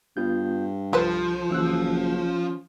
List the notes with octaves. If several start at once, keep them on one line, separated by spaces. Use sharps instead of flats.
G2 B3 F4 G6
C2 D3 F3 B4 C5
F#1 E3 E6 F#6
C#4